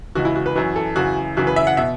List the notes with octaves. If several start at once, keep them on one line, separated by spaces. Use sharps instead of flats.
C#2 C#3 E3 F#4
E4
F#4
B4
F#2 E3 F#4
A4
F#2 C#3 E3 F#4
F#2 C#3 E3 F#4
B4
E5
F#5
B2 E5